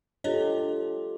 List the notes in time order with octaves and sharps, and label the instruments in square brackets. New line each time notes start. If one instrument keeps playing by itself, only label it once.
[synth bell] D4 C#5 D#5 [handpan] F4 G4 A4